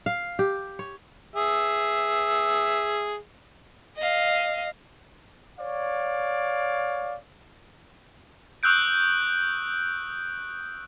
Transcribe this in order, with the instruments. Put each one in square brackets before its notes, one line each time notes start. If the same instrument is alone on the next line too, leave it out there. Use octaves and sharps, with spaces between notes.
[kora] F5
G4
C#5
[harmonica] G#4 E5
[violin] D#5 F5
[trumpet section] C#5 D5 F5
[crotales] C#6 D#6 E6 F#6 G6 D7